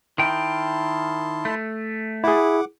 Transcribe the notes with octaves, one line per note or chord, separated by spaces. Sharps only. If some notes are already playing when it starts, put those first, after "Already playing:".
D#3 E4 G5 A5 C6
A3
E4 G#4 F#5 D6